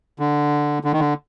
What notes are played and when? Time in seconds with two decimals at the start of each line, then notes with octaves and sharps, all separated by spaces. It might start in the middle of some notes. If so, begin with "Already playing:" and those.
0.19 D3
0.84 D3
0.93 D#3
1.00 D3